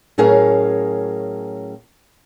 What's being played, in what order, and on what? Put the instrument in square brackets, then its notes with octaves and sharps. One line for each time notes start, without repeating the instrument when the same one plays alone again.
[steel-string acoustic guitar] A2 F#3 C#4 G#4 A#4 F5